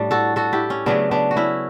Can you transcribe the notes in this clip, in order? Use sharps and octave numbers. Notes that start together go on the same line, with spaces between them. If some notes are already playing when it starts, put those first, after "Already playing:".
Already playing: A2 G3 D4
F#4 A4
F#4 A4
E4 G4
C#4
C#3 F#3 A3 B3 D4
B3 D4
F#4
C#4 E4